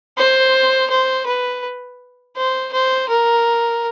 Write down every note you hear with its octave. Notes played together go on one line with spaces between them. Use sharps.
C5
C5
B4
C5
C5
A#4